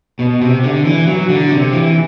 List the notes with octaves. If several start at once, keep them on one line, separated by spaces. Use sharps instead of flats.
B2
C3
D3
E3
F#3
D3
C3
E3